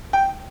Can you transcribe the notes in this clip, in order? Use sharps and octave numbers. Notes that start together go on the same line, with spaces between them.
G5